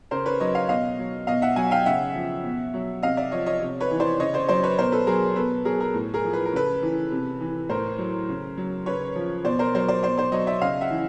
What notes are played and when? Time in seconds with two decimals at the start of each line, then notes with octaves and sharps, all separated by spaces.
0.11 C#3 A#4 C5
0.26 B4 C#5
0.40 F#3 C#5 D#5
0.55 D#5 F5
0.69 B2 D#5 F5
0.99 F#3
1.27 B2 D#5 F5
1.42 E5 F#5
1.56 F#3 F#5 G#5
1.71 F5 G5
1.86 C#3 E5 F#5
2.15 F3
2.44 B2
2.74 F#3
3.03 C3 D#5 F5
3.17 D5 E5
3.31 F3 C#5 D#5
3.46 C#5 D#5
3.61 C3
3.80 B4 C#5
3.91 E3
4.00 C5 D5
4.20 C#3 C#5 D#5
4.34 C5 D5
4.49 F#3 C5 D5
4.63 B4 C#5
4.78 B2 A#4 C5
4.92 A4 B4
5.07 F#3 G#4 A#4
5.36 B2 A4 B4
5.65 F#3 G#4 A#4
5.80 G#4 A#4
5.94 A2
6.14 G#4 A#4
6.24 F3
6.33 B4
6.46 A#4
6.53 C#3 A4 B4
6.83 E3
7.11 C3
7.41 E3
7.69 A2 A#4 C5
7.98 F#3
8.29 C#3
8.57 F#3
8.86 C#3 B4 C#5
9.16 F3
9.44 B2 C5 D5
9.59 A#4 C5
9.75 F#3 A#4 C5
9.88 C5 D5
10.03 B2 C5 D5
10.18 C5 D5
10.32 F#3 C#5 D#5
10.47 D5 E5
10.61 C#3 D#5 F5
10.81 E5 F#5
10.90 E3